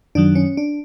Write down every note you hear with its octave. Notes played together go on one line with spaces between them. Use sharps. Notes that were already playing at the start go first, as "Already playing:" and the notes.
F#2 D#3 F#3 D4
C#4
D4